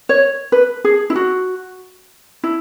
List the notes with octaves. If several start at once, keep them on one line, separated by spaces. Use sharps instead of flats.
C#5
B4
G#4
E4
F#4
E4